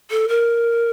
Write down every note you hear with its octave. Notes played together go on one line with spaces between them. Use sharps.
A4
A#4